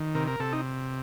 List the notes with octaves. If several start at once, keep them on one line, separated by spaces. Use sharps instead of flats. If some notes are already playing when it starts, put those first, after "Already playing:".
Already playing: D#3
C3 A#4
A#4
C3 A4
D#4